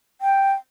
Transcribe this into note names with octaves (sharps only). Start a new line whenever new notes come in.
G5